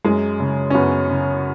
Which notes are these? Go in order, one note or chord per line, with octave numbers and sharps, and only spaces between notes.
F#2 G#3
C#3
C#4
F#2 B3
C#3